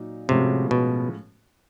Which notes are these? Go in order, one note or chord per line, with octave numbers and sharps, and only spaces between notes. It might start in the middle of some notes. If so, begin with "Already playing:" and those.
Already playing: A#2 F#3 D#4
A2 C3 F3 G#3 C#4 F#4
B2